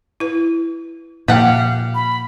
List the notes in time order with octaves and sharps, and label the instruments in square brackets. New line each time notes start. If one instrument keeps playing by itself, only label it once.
[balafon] E4 B4
[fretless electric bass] A#2 F3 [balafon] A#3 [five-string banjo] G4 F#5 [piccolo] F5
[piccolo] B5